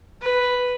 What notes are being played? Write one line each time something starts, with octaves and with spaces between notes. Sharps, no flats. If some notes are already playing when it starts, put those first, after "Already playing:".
B4